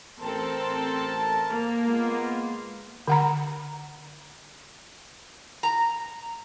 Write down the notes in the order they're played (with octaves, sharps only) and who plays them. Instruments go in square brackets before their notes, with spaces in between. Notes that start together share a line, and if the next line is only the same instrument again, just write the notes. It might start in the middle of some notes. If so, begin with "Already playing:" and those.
[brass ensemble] A1 A#4 A5 [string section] C4 A4
[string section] A#3
[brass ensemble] G#3 B3 F4
[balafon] D3 F#5 A#5
[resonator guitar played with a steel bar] A#5